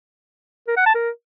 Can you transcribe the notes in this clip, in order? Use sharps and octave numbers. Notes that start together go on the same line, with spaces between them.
A#4
F#5
A5
A#4